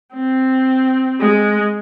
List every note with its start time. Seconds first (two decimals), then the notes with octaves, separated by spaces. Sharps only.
0.13 C4
1.20 G#3